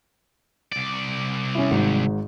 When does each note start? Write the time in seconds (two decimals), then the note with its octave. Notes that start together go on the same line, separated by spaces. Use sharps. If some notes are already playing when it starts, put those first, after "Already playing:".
0.72 C2 D5
1.55 C#4 E4
1.71 G#1 G#2